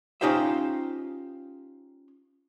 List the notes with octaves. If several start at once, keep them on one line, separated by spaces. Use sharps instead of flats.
C#4 D#4 F4 G4 C5 E5